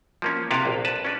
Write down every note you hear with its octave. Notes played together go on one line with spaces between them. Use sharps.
F3 A#3 C#4
C3 E4 F#4 A4 B4 F5
A#1
B4 A5
C#4 D4 B4